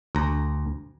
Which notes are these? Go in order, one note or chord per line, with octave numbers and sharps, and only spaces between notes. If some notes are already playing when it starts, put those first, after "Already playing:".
D2 A#5